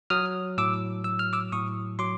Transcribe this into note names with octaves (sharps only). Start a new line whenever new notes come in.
F#3 D#6 F6
A2 D6 E6
F#3 E6
F6
D6 E6
A2 C#6 D#6
F#3 C6 D6